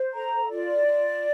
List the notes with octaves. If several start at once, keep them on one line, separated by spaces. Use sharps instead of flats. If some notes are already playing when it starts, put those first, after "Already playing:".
Already playing: C5
A4 A#5
F4 D5
F4